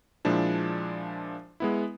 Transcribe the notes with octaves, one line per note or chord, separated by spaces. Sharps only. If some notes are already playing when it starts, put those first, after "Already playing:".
A#2 F3 G#3 D4 E4
G#3 B3 E4